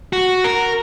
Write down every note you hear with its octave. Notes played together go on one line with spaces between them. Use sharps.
F#4
A#4